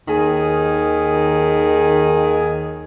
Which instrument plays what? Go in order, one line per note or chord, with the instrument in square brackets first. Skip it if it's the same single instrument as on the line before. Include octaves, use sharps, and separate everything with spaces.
[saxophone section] D#2 D#3 G#4